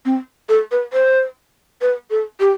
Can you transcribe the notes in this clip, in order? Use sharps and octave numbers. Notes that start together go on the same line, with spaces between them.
C4
A4
B4
C5
B4
A4
G4